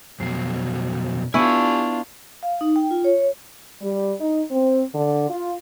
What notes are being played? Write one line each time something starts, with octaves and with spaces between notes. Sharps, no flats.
F2 B2 F#3 C7
B3 D4 E4 F4 G4 G#5 C#6 D#7
F5
D#4
G5
F4
C#5
G3
D#4
C4
D3
F4